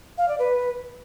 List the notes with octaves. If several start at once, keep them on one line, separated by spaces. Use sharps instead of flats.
F5
D5
B4